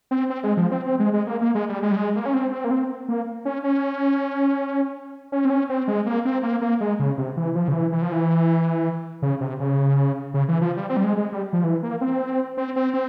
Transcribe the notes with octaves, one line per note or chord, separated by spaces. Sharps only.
C4
C4
G#3
F3
C4
C4
G#3
G#3
A#3
A#3
G#3
G3
G#3
G3
G#3
A#3
C#4
C4
C4
A#3
C4
A#3
C#4
C#4
C#4
C4
C#4
C4
G#3
A#3
C4
A#3
A#3
G#3
C#3
C3
E3
F3
C#3
E3
E3
F3
E3
C#3
C3
C#3
C#3
E3
F3
G3
C4
G3
G#3
G#3
G3
F3
E3
A#3
C4
C4
C4
C4